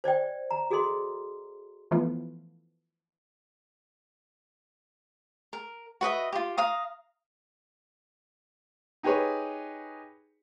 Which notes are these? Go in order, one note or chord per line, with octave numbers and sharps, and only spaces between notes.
C5 D5 D#5 G5
A#5
F#4 G#4 A4 D#5 C6
E3 F3 A3 B3 F4
A#4
F#4 B4 D#5 E5
F4 G4
F5 A#5 D#6
D#4 G4 G#4 B4 C#5